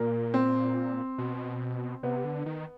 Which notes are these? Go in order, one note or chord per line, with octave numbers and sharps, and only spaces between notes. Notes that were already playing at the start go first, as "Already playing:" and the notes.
Already playing: A#2 A#3
C4
B2
C3 B3
D3
D#3